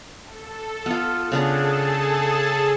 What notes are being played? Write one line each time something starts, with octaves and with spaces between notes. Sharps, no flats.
A4
B3 F4
C#3 B3 D4 G#4 A4 A5